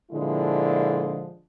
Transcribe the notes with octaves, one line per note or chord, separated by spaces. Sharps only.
A#2 D3 F3 G#3 E4